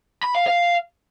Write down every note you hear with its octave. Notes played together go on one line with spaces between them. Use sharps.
B5
F5
F5